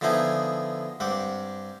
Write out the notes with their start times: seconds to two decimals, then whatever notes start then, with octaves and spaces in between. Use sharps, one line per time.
0.01 D3 F3 B3 D#4 E4 G#4
1.00 G2 C4 F#5 D6